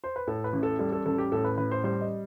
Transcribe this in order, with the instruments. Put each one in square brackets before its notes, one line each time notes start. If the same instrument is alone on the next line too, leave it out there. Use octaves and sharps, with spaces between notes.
[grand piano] C5
B4
A2 A4
B4
A1
A4
G3 A4
A4
A1 A4
G4
A2 A4
B4
A1 B4
C5
G3 C5
D#5